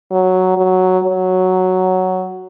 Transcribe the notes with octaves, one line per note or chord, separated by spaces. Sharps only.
F#3
F#3
F#3